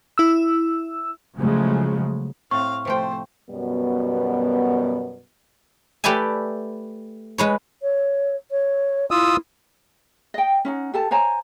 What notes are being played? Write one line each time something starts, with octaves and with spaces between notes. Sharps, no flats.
E4 E6
C#3 F3 F#3 G#3 A3
A2 C4 F5 C#6
C3 F3 A3 C5 G5
F#2 B2 G3 B3
A3 G4 B4 D5 E5 G#5
G#3 B4 C#5
C#5
C#5
E4 F4 D#6 E6
D#5 G5
C#4 D#4 F#5
G4 A4 A5
C5 C#5 G#5 A#5